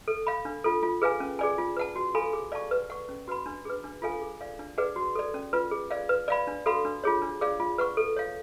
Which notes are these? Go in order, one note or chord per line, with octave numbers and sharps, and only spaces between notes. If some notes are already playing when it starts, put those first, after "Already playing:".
A4
F5 B5
D4
F4 A4
F4
G#4 B4 F5 G#5
C#4
G#4 D5 G#5
F4
B4 F#5 A5
F#4
A4 F5 G#5 B5
G#4
D5 F5 A5 C#6
B4
F#5 C#6
C#4
F#4 B4 F#5 B5
D4
G#4 B4
D4
F4 A4 F5 G#5
G#4
D5 F5
D4
G#4 B4 D5 F#5
F#4
A4 D5
C#4
F4 B4
G#4
D5 F5
B4
D5 F5 B5
D4
F#4 A4 F5 B5
D4
F4 G#4 C#5
D4
G#4 D5 F5
F4
B4 F#5 C#6
A4
C#5 F5